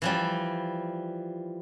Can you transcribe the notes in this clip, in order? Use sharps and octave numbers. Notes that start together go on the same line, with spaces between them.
E3 F3 G3